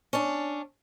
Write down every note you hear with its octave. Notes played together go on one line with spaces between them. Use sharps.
C#4 D4